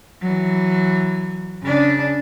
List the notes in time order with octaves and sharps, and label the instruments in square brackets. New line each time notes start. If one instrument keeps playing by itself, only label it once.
[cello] E3 F#3
C#3 D4